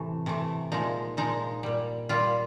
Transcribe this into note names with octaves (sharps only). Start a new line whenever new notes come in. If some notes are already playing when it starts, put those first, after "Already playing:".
Already playing: A2 C3 E3 A3
C3 E3 A3
A#2 F3 G#3 D#4
A#2 F3 G#3 D#4
A#2 G3
A#2 G3 F4